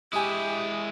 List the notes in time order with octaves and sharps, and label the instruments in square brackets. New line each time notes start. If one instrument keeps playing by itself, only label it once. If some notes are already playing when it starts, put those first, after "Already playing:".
[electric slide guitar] G#3 E4 [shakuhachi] G4 [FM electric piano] G#5 D#6